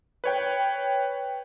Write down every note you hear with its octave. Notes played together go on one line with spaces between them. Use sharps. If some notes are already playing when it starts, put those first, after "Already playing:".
B4 C#5 G5